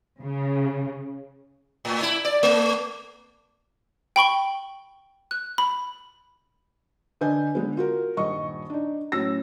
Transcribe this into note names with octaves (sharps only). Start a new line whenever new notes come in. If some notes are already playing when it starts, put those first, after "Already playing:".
C#3
A2
E4
D5
A3
G5 B5 C#6 G7
F#6
B5
D3 D4 B4 D#5 G#5 G6
D3 G#3 B3
F4 F#4 A#4
D#1 G2 D#5 C#6
D4 D#4
A2 F#3 C#4 E6 A#6